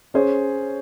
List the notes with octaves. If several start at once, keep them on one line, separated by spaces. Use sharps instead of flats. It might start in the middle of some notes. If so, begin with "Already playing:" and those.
C#4 G#4 C5